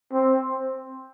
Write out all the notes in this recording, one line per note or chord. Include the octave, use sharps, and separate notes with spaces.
C4